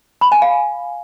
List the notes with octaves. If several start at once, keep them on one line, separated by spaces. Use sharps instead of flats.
B5
G#5
F5